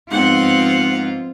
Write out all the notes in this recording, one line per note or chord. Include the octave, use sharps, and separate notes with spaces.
G#2 F3 B3 C4 F4 F#5